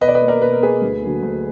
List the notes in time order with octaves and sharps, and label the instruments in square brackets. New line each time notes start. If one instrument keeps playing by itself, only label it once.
[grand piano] B2 B4 D#5
D5
B4 D#5
A#3
A#4 D5
B2 B4
A#4
A#3 G#4 B4
D2
D3 F#3 A#3
D2